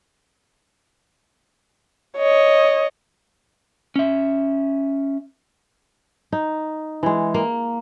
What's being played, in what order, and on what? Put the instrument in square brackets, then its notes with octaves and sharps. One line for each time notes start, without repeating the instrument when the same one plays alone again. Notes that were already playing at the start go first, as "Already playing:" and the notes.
[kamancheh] C#5 D#5
[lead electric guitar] C#4 E5
[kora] D#4
E3 G#3
A#3